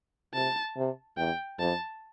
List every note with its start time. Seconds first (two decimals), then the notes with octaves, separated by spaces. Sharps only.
0.34 C3 A5
0.76 C3
1.17 E2 G5
1.59 F2 A5